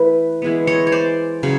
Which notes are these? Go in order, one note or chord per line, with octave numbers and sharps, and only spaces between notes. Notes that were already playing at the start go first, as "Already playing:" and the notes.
Already playing: E3 A3 B4
E3 G#3 B3
C#5 D#5
C#5
C5 D5
C#3 F#3